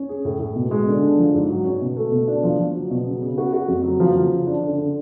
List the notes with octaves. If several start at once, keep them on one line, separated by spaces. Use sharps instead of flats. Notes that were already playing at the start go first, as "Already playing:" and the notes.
Already playing: C#4
G#4
A2
A2
B2
G#3
D3
D4
F3
G#2
F#3
C#4
B2
A3
B2
D4
F3
F3
F#3
B2
C#3
C#3
F#4
F#4
F2
F#3
F3
F3
C#3
D4
D3
D3